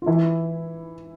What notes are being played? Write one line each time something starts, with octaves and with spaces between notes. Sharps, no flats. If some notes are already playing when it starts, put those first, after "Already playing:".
F4
E3 E4